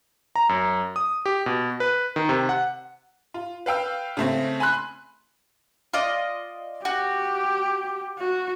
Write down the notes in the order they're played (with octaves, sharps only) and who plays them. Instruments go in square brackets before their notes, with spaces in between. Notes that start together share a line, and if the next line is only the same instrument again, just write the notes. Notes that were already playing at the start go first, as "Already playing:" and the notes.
[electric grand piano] A#5
F#2
D#6
G4
B2
B4
D#3
C3
F#5
[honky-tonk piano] F4
B4 F5 G5 E6
C#3 A3 C4
G#5 B5 C6 F#6
[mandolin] F4 D5 D#5
[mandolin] F#4 [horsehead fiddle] G4
[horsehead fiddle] F#4